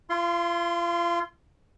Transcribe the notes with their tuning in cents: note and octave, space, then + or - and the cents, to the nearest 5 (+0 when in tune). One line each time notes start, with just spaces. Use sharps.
F4 -30 C6 +0